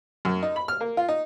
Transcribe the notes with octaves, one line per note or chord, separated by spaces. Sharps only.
F#2
D#4
B5
F6
A#3
F4
D#4